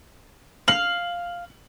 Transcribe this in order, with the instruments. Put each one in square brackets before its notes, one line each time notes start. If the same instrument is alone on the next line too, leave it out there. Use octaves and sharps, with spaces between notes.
[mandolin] F5 [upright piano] F#7